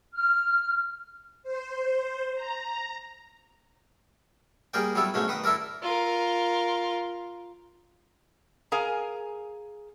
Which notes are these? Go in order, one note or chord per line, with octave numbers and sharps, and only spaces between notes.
F6
C5
A#5
G3 A#3 G#4 A#4 D5 G5
F#3 G3 B3 E4 A4 D5
G#2 B2 A3 C#4 D4
D#3 B4 D#6
D4 E4 A4 A#4 D5
F4 A#4
G#4 A#4 F5 G#5 A#5